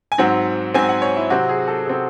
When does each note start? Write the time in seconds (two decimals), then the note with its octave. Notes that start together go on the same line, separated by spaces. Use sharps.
0.12 G#5
0.18 G#2 F#3 C4 F#5
0.74 G#2 F#3 C4 G#5
0.89 F#5
1.02 C#5
1.16 E4
1.30 C3 F#3 C4 F#4
1.49 G#4
1.68 A4
1.86 C3 F#3 C4